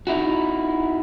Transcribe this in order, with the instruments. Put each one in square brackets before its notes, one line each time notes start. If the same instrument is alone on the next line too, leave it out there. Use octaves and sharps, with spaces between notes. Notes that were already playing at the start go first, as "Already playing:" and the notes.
[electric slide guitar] D#4 E4 F#4